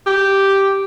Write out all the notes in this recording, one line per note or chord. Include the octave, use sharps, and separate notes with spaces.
G4